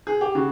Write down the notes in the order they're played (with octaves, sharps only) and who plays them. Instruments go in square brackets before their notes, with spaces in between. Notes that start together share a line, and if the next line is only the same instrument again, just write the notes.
[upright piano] G#4
G4
C#3 F#4